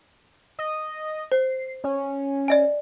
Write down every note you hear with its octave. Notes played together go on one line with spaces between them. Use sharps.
D#5
C5 C7
C#4
D5 D#5 G#5